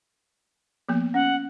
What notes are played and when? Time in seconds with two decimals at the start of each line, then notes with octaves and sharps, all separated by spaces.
0.89 F3 A#3 B3
1.14 C#4 F#5